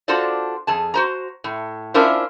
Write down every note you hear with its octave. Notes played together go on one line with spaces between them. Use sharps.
D4 F4 F#4 A4 C5 D5
F2 G#4 A5
F#4 C5 A#5
A2
C#4 D4 E4 F4 A#4 C5